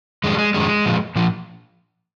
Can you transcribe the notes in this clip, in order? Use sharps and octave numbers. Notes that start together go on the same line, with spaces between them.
F2 D#3 G3 G#3
G#3
F2 D#3 G3 G#3
A#2 F3
A#2 F3